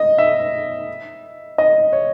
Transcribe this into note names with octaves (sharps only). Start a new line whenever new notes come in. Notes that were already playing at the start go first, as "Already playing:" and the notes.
Already playing: D#5
E5
D#5
C#5